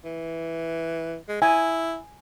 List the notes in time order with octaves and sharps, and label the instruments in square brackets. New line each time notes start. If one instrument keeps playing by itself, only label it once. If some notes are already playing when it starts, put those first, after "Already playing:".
[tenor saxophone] E3
G#3
[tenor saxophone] E4 [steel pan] G#5